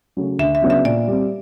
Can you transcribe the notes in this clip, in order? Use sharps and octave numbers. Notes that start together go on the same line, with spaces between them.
C#3 F#3 A3
D2 E5
E5
C#3 F#3 B3 D4
E5
A#2 D5
G3 C4